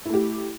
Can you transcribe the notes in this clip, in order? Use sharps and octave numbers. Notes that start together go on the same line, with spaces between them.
A3 E4 G4